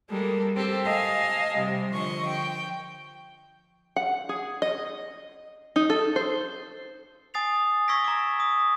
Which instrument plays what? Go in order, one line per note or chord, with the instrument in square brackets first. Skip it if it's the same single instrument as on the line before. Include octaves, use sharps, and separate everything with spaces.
[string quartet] G3 G#3 A#3 A4
C4 G4 A4
D#5 F5 G#5 A5
C3 G3
D3 F3 D#5 C#6
G5
[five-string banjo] F#5
G#4
D#5
D#4
A4
C5
[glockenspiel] G#5 D#6 A6 C7 F7
C#6 E6 G#6 A#6 B6 D7
A#5 D6
D#6